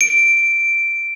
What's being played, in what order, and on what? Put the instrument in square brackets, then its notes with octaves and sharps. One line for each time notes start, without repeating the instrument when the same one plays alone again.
[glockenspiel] D7